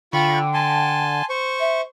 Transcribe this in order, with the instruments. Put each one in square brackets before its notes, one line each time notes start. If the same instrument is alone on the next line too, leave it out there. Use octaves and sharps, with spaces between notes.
[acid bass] D3 [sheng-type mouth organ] F4 B5 C#6 [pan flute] G5
[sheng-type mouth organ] G#5 A5 C6
C5 C#6
[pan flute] E5